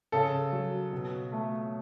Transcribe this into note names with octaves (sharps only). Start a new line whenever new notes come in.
C#3 A4
F#3
B2
A3